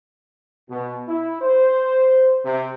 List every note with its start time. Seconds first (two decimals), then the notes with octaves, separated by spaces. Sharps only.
0.69 B2
1.08 E4
1.41 C5
2.45 C3